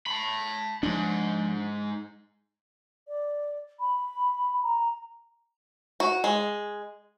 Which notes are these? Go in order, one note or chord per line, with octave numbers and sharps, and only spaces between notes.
A5 B5
G#2 F3 D4
D5
B5
A#5
F#4
G#3